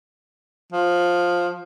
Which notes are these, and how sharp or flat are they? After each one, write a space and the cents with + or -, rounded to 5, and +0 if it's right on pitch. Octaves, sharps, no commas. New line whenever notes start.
F3 +10